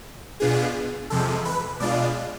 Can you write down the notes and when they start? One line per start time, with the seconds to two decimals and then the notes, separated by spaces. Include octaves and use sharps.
0.40 B2 B3 D4 F4 G#4
1.10 E2 C3 F3 G#3 A4
1.45 B4
1.80 B2 G#3 D4 F4 D5